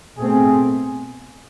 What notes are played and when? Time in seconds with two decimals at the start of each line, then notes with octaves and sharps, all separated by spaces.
0.18 B2 A3 C4 G#4